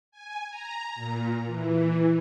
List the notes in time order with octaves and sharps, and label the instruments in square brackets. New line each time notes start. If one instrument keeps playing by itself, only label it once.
[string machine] G#5
A#5
A#2
E3